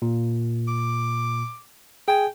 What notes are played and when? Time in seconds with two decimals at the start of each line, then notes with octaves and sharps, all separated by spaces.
0.02 A#2
0.68 D6
2.08 G#4 G5 G#5